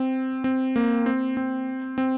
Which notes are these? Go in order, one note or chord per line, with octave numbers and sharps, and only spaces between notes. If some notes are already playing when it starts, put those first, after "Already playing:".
Already playing: C4
C4
A#3
C4
C4
C4